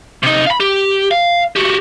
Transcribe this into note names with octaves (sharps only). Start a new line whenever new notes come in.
C3 D#4
F5 B5
G4
F5
F#4 G4